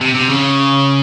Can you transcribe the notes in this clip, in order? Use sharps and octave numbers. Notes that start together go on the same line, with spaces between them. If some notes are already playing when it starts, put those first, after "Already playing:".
C3
C3
C#3